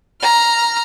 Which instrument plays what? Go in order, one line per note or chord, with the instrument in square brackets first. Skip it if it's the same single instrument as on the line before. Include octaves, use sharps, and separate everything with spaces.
[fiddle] A#5 F6